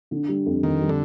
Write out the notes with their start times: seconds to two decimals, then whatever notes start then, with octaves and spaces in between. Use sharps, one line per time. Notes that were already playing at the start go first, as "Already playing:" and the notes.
0.11 D3
0.28 G3
0.46 F2
0.63 F2 D#3
0.81 G3
0.89 D3